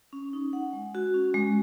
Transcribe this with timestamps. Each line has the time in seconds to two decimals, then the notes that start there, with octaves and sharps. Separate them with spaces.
0.13 C#4
0.33 D#4
0.53 F#5
0.73 G#3
0.95 F#4
1.14 C#4
1.34 G#3